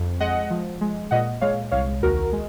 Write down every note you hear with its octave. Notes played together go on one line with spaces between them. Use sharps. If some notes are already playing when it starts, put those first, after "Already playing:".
Already playing: F2
G#3 D#5 F#5
F3
G#3
A#2 D#5 F#5
G#3 C#5 F5
C2 C#5 F5
D#2 F#4 A#4
G#3